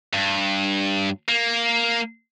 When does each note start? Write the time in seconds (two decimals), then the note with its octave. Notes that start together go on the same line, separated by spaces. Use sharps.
0.14 G2
1.29 A#3